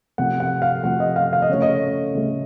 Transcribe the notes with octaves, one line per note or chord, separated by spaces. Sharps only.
C3 F3 A3 F#5
F#5
F5
C3 F3 A3 F#5
D#5
F5
F5
D#5
C#3 A3 C#5
D#5
C#3 A3